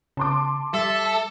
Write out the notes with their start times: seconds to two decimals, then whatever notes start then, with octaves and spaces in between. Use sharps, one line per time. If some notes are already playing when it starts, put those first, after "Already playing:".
0.17 C#3 A5 C6 D6
0.74 G3 A4 E5